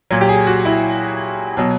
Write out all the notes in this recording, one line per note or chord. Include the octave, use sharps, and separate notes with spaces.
A#2 F#3
G4
G#4
F#4
E4
B2 F#3